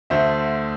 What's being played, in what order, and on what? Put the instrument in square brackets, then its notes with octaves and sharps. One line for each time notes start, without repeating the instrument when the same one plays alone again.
[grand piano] D2 D3 A3 C5 E5